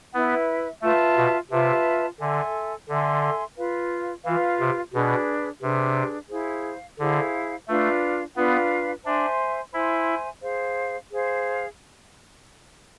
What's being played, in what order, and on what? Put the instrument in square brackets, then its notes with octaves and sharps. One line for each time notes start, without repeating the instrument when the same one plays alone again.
[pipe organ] B3 [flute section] E4 B4 E5
[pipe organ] A3 [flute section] F4 B4 E5 A5
[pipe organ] B2
[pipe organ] C3 [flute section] F4 B4 E5 A5
[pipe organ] D3 [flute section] A4 E5 G#5 C6
[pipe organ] D3 [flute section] A4 E5 G#5 C6
[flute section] F4 B4 F5
[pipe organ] E3 [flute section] F4 B4 F5
[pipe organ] C3
[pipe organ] B2 [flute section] D4 G#4 B4
[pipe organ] C3 [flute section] D4 G#4 B4
[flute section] E4 G#4 C5 F5
[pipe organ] D3 [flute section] E4 G#4 C5 F5
[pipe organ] A3 [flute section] D4 F4 B4 F5
[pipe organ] B3 [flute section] D4 F4 B4 F5
[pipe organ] D4 [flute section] C5 E5 G#5 C6
[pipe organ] E4 [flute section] C5 E5 G#5 C6
[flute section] G#4 C5 F5
G#4 C5 F5